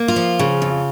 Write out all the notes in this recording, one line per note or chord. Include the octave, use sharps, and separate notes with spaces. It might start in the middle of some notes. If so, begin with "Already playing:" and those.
Already playing: A#3
F4
F3
C#3
F2